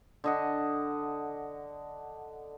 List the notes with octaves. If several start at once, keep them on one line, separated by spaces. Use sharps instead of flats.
D3 D#5 F#5